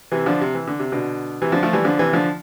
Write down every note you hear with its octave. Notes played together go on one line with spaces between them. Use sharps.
C3 E3
D3 F3
C3
E3
D3
C3
B2 D3
C3 E3
D3 F3
F3 A3
E3 G3
D3 F3
C3 E3
D3 F3